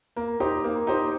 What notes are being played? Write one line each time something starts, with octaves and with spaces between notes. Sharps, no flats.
A#3
D#4 G4 C5
A#3
D#4 G4 C5